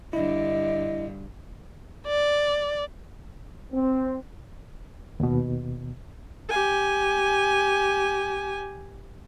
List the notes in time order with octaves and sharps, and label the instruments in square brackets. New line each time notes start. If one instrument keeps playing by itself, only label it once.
[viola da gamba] G2 D3 [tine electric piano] E4 [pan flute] D#5
[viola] D5
[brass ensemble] C4
[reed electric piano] D#2 B2
[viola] G4 G#5